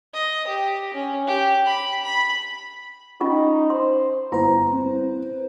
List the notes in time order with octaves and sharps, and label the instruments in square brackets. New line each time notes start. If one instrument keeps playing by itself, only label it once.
[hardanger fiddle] D#5
G4
C#4
G4
B5
B5
[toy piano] C#4 F4 C#6 [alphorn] D#4
[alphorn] C5 [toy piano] C6
[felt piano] G1 A#5 [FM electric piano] E4 B4 C5
[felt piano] C4